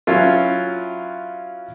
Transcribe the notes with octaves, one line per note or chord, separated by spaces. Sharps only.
F#3 C#4 E4 F4